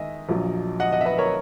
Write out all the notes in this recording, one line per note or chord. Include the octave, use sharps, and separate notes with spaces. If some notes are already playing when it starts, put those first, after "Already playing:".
Already playing: D#3 G#3 D#5 E5
A#1 A#2 F#3
D#5 F#5
D#5 F#5
E5
B4 D#5
A#4 C#5